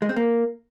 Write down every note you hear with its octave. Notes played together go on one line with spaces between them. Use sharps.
G#3
C4
A#3